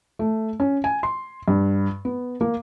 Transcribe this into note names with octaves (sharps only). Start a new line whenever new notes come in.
A3
C#4
G#5
C6
G2
B3
A#3